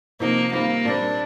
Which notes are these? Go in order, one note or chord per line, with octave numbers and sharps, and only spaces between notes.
C3 F3 A#3 C4 D#4
D#3 G3 A#3 C4 F4
A#2 G3 C4 D4